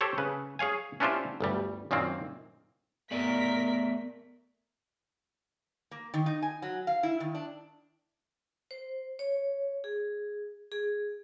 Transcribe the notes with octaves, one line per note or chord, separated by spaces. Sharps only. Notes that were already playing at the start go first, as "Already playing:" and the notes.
G4 A4 C5 C#5
C#3 B4
G#4 C#5 F5 G#5
C#4 D4 E4 F4 G4 C5
G1 D2 G3
F#2 A#2 D#3 A#3 C4
A3 B3 A#4 D5 B6
A#3
D#3
D#4
G#5
F#3
F5
E4
D#3
D4
C5
C#5
G#4
G#4